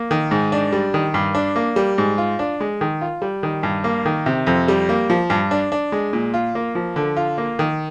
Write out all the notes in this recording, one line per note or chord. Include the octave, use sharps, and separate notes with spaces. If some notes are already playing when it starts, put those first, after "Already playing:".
Already playing: A#3
D#3
G#2
D4
G3
D#3
G2
D4
A#3
G3
G#2
F4
D4
G#3
D#3
F4
G3
D#3
G2
A#3
D#3
C3
F2
G3
A#3
F3
G2
D4
D4
G#3
A#2
F4
A#3
F3
D3
F4
A#3
D#3